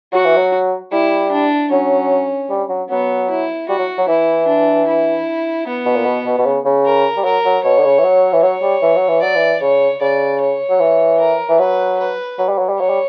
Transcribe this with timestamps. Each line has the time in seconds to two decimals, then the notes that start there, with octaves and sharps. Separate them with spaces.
0.12 F#3 F#4
0.25 E3
0.37 F#3
0.92 G3 E4
1.32 D4
1.70 F#3 C#4
2.50 G3
2.69 F#3
2.90 F#3 B3
3.30 E4
3.69 G3 F#4
3.78 F#3
3.98 F#3
4.08 E3 E4
4.47 D4
4.87 E4
5.67 B3
5.85 B2
5.95 A#2
6.06 B2
6.25 B2
6.38 B2
6.45 C#3
6.65 C#3
6.85 A#4
7.17 G3
7.24 F#3 A#4
7.45 F#3
7.63 B2 C#5
7.78 D3
7.84 C#3
7.99 E3
8.04 F#3
8.33 E3
8.43 F#3 C#5
8.62 G3
8.82 E3
8.96 F#3
9.08 E3
9.21 F#3 D5
9.35 E3
9.61 C#3 C#5
10.01 C#3 D5
10.41 C#5
10.69 F#3
10.80 E3
11.20 A#4
11.49 E3
11.59 F#3 B4
11.99 B4
12.39 F#3
12.49 G3
12.59 F#3
12.69 G3
12.78 F#3 C#5
12.89 G3